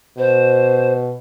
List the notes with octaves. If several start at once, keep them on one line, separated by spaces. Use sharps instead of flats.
B2 C5